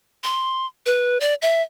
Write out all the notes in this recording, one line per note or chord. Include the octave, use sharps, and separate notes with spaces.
C6
B4
D5
E5